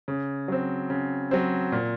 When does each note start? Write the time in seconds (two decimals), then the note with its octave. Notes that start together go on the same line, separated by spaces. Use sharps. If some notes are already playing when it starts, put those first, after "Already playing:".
0.08 C#3
0.48 F#3 C4
0.90 C#3
1.31 F#3 C4
1.72 A#2